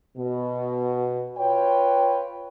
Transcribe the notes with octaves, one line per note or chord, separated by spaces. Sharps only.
B2
F4 B4 C#5 G5